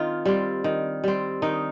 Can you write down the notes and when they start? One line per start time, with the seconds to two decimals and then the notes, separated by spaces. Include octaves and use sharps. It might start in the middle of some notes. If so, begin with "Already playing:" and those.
Already playing: D#3 C4 F4
0.26 G3 C4
0.64 D#3
1.04 G3 C4
1.42 D#3 D#4